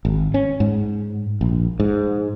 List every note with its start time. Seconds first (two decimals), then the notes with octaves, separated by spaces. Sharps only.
0.05 G#1
0.34 C#4
0.60 G#2
1.41 A#1
1.80 G#2